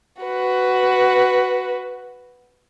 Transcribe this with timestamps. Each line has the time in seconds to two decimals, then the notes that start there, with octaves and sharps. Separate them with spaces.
0.22 F#4 B4